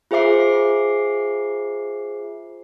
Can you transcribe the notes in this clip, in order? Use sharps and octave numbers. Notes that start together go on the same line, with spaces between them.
F4 G#4 C5 E5 D6 C7